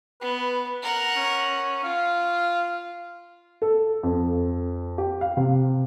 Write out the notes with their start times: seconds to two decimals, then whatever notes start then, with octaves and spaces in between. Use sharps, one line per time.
0.21 B3 B4
0.83 A#4 F#5
1.16 C#4
1.84 F4 F5
3.62 A4
4.03 F2
4.98 G4
5.21 F5
5.37 C3